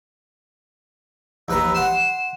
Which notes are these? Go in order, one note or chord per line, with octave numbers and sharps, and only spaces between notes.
D#2 B4 A#5 E6
F#5 C6 E7